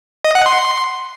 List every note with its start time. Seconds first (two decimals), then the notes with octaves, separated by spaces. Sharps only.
0.24 D#5
0.35 F#5
0.46 C6